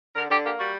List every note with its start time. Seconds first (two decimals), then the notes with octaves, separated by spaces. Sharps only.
0.15 D3 A#4
0.30 D3 G4
0.45 A#3 G4
0.59 G3 F#4